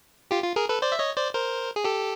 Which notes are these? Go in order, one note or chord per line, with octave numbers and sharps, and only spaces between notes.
F4 G4
F4
G#4 A#4
A4 B4
C5 D5
E5
C#5 D#5
C5 D5
A#4 C5
G#4
G4 A4